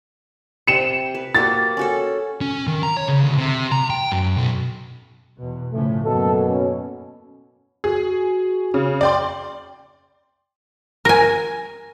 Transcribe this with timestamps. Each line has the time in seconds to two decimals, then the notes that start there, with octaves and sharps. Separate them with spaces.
0.67 C3 G5 C#7 E7
1.15 B4
1.35 A#3 F#4 G4 A6
1.77 C#4 F#4 A4
2.41 C#4
2.67 D#3
2.83 A#5
2.97 C#5
3.08 C#3
3.24 D2
3.38 C3
3.72 A#5
3.90 G5
4.12 F#2
4.37 B1
5.37 E2 B2
5.72 A2 C#3 F3 A3
6.04 F#2 B2 F#3 A#3 A4
6.47 C#4
7.84 F#4 G#4
8.74 C#3
9.01 D5 G5 C6
11.05 A#4 G#5